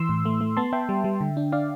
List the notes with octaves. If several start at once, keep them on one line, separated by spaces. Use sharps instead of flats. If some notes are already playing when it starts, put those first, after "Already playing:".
Already playing: E3 C6 E6
A2
A3
A3
B3 A5 C6
B3 E5 G5
G3
G3
D3
D4
D4 D5 F5